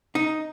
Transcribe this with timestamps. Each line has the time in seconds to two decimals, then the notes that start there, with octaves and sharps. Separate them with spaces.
0.15 D#4